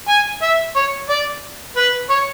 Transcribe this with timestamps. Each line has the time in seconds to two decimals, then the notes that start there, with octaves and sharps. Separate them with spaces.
0.09 G#5
0.42 E5
0.76 C#5
1.10 D5
1.77 B4
2.10 C#5